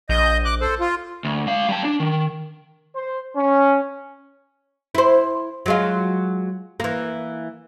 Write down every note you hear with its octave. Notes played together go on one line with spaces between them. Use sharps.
A#1 D#5 G6
D6 F#6
A4 C5
F4
D2
G#3 F5
G3 A5
D4
D#3
C5
C#4
E4 C5
F#3 G#3 F4
E3 A#3